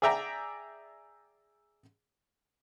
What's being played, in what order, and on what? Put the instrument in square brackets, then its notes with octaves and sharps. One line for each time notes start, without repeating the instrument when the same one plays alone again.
[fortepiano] G#4 D5 E5 G5 A#5